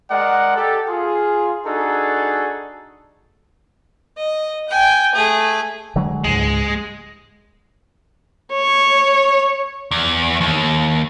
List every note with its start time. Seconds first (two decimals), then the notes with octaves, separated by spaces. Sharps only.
0.11 G#3 A#4 D5 F#5
0.56 G4 A4
0.88 F4 G#4
1.66 D4 D#4 F#4 G#4 A4
4.17 D#5
4.69 G5 G#5
5.15 A3 G#4
5.96 D3 F#3 G#3
6.24 C#2 G#2 G#3
8.53 C#5
9.91 E2
10.41 D#2